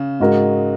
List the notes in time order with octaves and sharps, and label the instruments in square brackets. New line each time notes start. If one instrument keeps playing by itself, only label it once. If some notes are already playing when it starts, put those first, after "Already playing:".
Already playing: [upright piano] C#3
[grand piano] G#2 G#3 F#4 A#4